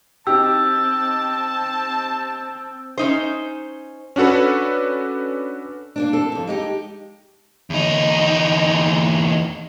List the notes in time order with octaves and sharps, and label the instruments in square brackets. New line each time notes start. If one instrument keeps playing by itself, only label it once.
[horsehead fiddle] C4 [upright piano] D#4 G4 [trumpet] A5 [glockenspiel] E6
[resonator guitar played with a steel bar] C#4 D#4 C5
[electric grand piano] C#4 D4 F#4 A4 B4
[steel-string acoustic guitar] A#3 C4 D4
C4 A4
F2 G#2
G#3 D#4 G4
[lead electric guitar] E2 D#4